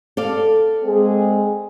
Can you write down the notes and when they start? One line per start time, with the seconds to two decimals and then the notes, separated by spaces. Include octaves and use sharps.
0.17 A4 D5 F5
0.84 G#3 C4 G#4